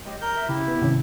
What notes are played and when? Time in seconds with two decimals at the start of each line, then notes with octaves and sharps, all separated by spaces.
0.06 F#3 G#3 G4 D#5
0.21 A#4 A#5 G6
0.37 E5
0.49 C#3 E4 G4
0.68 B3
0.82 G#2 C3 D#3 C#4